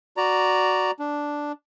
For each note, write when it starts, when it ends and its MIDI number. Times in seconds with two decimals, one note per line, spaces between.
0.17 0.91 66
0.17 0.91 74
0.17 0.91 82
1.00 1.52 62